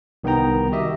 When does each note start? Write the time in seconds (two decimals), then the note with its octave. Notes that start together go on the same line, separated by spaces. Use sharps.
0.24 C2 D#3 B3 D#4 G5 A#5
0.72 F#4 G4 D#5 E5